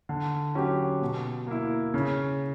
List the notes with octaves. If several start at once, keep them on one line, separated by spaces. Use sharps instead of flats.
D3
F#3 C#4 G4
B2
A#3 E4
C#3